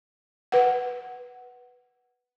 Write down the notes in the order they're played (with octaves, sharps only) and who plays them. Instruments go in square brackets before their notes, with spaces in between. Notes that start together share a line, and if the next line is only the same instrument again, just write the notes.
[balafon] B4 F#5